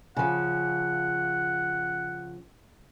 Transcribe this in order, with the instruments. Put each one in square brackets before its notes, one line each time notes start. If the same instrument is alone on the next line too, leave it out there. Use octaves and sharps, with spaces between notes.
[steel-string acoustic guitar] C#3 F3 [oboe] F#5